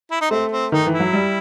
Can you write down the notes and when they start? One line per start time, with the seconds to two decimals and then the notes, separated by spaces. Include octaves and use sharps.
0.11 E4
0.21 D#4
0.31 A3 C4
0.52 C4
0.72 D#3 D#4
0.86 E3
0.93 E4
1.00 F#3
1.13 G3